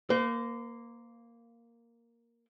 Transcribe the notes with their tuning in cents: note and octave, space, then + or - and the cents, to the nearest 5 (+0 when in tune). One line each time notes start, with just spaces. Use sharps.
A#3 +0 C5 -40